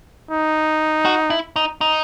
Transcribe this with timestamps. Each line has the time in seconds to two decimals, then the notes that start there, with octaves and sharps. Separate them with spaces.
0.31 D#4
1.05 F#4
1.30 E4
1.56 D#4
1.81 D#4